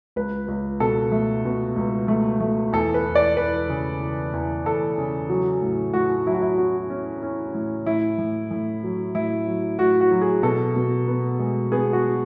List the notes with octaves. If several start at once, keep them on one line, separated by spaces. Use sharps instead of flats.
C#2 B4
C#2
B2 A4
A3
B2
C#2
A3
A3
E2 A4
B4
E2
D5
E2 B4
C#3
E3
E2
E2 A4
C#3
F#3
A2
A2 F#4
F#3 E4
F#4
E4
C#4 F#4
C#4
C#4
A2
A2 E4
A2
A2
F#3
A2 E4
F#3
A2 F#4
F#4
F#3
G#4
B2 A4
B2
B3
G#3
B3 G#4
F#4